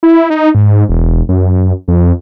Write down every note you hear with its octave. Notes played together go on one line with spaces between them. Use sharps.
E4
D#4
G#2
E1
F#2
F2